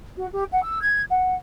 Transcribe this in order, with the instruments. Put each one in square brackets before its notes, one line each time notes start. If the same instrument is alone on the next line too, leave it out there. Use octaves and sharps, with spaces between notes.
[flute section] F#4
G4
F#5
E6
G#6
F#5